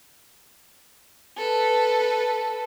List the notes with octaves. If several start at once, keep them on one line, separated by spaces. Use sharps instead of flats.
A4 B4